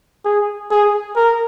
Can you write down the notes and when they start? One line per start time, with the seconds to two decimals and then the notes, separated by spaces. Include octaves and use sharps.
0.25 G#4
0.71 G#4
1.16 A#4